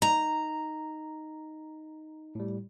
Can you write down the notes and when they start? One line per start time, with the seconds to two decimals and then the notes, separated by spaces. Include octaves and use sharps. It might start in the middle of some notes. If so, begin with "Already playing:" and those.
0.02 D#4 A#5
2.35 A2 G3